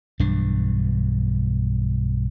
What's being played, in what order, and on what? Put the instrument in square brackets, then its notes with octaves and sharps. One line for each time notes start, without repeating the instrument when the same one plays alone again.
[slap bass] B1 G2 E3 D4